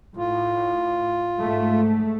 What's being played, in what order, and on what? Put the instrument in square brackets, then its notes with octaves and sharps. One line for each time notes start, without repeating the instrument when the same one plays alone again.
[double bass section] A2 [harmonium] F4
[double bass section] G#2 A3